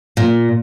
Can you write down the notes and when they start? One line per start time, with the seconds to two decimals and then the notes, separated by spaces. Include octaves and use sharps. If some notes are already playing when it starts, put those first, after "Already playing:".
0.17 A#2